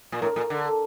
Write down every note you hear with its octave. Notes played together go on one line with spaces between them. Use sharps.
A#2
A2 A#4
A#2
D3